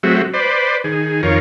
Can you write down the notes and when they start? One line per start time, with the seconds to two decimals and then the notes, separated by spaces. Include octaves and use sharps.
0.03 F#3 G#3 A3 C4 F#4 E5
0.34 B4 C5 D5
0.84 D#3 G#4
1.23 F2 D#3 F4 A#4 C#5